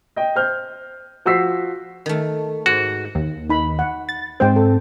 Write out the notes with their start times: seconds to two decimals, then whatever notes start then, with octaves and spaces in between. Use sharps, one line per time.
0.16 D#5 G5
0.36 C5 F6 G6
1.26 F3 F#4 C5 E6 B6 C7
2.06 D#3 A3
2.66 G#2 F#4
3.15 D#2
3.50 D#4 B5
3.79 F#5
4.09 A6
4.40 G#2 G#3 C4 C5 G5
4.56 A4